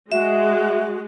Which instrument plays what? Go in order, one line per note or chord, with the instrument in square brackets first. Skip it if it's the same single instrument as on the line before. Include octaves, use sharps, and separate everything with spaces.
[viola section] G#3 [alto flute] F#4 [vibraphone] E5